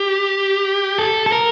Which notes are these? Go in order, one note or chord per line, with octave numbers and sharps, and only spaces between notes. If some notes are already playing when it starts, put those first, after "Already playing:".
Already playing: G4
A4
A4
A#4